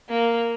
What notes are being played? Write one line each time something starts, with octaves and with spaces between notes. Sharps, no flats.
A#3